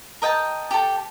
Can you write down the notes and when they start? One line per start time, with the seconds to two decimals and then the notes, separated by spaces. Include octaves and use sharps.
0.22 A#4 D#5 G5 A5
0.71 G4 A4